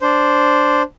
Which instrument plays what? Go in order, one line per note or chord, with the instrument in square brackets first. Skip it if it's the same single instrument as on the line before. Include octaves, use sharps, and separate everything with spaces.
[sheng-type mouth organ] D4 C5